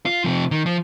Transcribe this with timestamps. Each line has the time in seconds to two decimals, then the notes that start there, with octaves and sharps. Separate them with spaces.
0.06 F4
0.24 C3 F3
0.51 D#3
0.66 F3